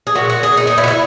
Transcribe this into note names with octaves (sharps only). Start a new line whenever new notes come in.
G#4
A#2 G#3 F#4
F#4
G#4
A#2 G#3 D#4
D#4
E4
F#4
E4